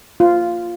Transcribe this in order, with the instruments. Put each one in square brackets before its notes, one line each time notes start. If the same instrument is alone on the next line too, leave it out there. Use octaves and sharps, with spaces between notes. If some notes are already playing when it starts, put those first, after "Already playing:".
[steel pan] F4